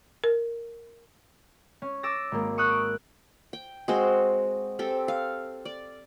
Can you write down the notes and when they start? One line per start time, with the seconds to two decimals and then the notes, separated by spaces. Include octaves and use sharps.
0.24 A#4
1.82 C#4
2.03 D6 E6 A6 A#6
2.32 G#1 A#3
2.58 C#6 D#6 E6 F#6
2.70 D7
3.53 G5
3.88 G#3 C4 F#4 C5
4.79 C4 G4 A4
5.08 F5
5.65 D5